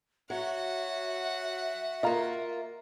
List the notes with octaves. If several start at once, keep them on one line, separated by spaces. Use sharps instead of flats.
F#3 F#4 E5 F#5
A#3 F4 D#5 F5 A#5